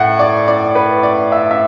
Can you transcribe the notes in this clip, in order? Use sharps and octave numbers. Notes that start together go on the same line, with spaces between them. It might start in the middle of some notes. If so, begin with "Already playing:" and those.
Already playing: A2 F#5
D5
D5
B4
D5
E5
E5